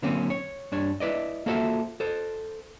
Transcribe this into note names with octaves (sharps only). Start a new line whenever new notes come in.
D3 F#3 A#3 C4 C#4
C#5
G2 D4 C#5
E4 B4 D5 D#5
A#3 F4 F#4 A4 C5 E5
A4 C5